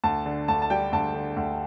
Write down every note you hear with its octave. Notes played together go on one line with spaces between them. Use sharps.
D2 A5
D3
D2 A5
A5
G3 G5
D2 A5
D3
D2